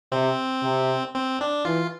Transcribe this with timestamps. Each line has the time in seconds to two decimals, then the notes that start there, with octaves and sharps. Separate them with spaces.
0.12 C3 C4
0.63 C3
1.15 C4
1.41 D4
1.65 E3 F4